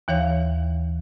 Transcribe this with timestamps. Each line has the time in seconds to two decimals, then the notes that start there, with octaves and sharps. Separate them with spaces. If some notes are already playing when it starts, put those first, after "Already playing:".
0.08 D#2 E3 C#5 F5